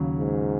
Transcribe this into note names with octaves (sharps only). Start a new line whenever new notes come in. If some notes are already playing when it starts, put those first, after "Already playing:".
Already playing: D#2 C#3 F#3
G#2